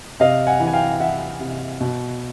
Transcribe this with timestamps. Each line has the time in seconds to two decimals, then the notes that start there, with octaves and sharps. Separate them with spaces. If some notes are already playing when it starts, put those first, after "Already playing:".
0.20 C3 D#5 F5
0.47 F#5 G#5
0.60 E3
0.68 G#5
0.73 F5 G5
1.00 E3 E5 F#5
1.40 C3
1.80 B2